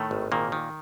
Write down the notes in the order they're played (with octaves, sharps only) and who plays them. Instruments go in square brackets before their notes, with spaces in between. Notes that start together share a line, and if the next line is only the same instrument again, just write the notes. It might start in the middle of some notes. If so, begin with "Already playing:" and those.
Already playing: [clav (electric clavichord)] A2 D#3 A3
G#1
A#2 D#3 A#3
D#3